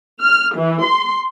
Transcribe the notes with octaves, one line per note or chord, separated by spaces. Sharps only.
F6
E3
C6